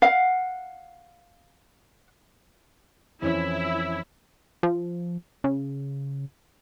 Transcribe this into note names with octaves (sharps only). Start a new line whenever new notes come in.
F5 F#5
F2 E3 C#4 E4
F3
C#3